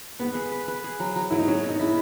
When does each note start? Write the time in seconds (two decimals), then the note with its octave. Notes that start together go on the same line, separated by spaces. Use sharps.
0.19 B3 B4
0.35 G#4
0.52 B4
0.68 B4
0.84 G#4
1.00 F#3
1.16 F#3
1.30 F#3 E4
1.39 D#4
1.48 F#3 C#4
1.63 B2
1.69 D#4
1.80 C#4 E4